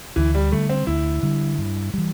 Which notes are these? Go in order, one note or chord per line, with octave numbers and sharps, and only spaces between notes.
D2 E3
G3
D3 G3 A3
C4
D2 E4
D3 G3
G2
E3 G3